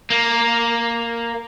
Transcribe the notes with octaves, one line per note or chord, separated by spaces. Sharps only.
A#3